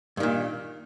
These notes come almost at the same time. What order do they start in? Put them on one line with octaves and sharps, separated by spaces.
G2 D#3 A#2